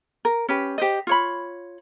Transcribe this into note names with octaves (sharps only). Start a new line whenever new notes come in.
A#4
C#4 G4 B4
G4 C5 D#5
F4 C#5 B5